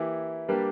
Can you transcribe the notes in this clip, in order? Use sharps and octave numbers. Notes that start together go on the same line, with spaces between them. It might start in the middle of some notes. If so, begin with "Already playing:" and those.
Already playing: E3 A#3 E4 G4
G3 A#3 D4 G4 B4